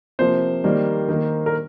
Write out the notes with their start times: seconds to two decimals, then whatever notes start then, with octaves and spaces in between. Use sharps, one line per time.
0.19 C3 F3 A#3 C5
0.64 D#3 G3 A#3
1.08 D#3 A#3
1.46 A#4